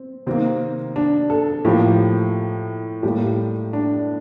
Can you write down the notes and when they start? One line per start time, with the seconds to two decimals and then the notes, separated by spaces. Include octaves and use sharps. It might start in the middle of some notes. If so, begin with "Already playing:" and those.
Already playing: C4
0.27 C3 D#3 A#3 C4
0.96 D4
1.30 A4
1.65 A2 F3 A#3 G4
3.03 A2 G3 A#3 G4
3.73 D4